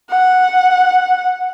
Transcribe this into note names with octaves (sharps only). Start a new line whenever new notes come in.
F#5